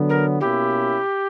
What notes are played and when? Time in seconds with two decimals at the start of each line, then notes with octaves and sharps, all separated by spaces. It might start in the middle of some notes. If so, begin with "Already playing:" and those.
Already playing: D3 F#3 B3
0.09 A#4
0.40 B2 A#3 C#4 E4 G4